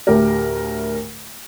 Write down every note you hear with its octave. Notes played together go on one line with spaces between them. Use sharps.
D2 A2 A3 G4 A#4